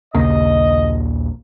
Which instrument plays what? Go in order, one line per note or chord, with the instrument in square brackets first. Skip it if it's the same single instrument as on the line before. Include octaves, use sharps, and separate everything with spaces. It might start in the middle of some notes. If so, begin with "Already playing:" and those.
[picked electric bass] A#1 D#2 A#3 [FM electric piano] C#3 [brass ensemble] D#5